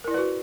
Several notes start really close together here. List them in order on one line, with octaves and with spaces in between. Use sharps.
A#4 E4 D5 B4 F#4